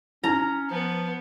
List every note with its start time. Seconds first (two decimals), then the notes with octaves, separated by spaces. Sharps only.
0.24 C#4 D#4 E4 A#5
0.70 F3 B3